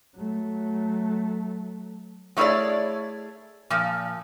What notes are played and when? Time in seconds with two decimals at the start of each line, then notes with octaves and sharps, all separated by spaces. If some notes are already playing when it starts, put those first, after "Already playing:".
0.15 F#3 A3
2.37 F#3 A3 E4 G#4 C#5 D5
3.70 A#2 F3